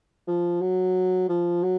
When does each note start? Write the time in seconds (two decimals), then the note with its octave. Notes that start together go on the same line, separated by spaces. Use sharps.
0.27 F3
0.61 F#3
1.29 F3
1.63 F#3